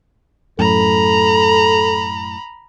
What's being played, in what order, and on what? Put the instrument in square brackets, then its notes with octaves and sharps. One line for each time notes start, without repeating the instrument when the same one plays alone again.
[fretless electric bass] F#2 A2 [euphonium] A4 [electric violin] A#5 B5